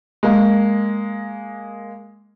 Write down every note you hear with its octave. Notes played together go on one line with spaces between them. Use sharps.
G#3 A#3